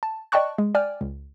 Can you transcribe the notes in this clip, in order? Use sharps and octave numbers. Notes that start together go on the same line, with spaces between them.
A5
D5 D#5 G5 A5 C#6 F#6
G#3
D5 G5 G#5 F6
C#2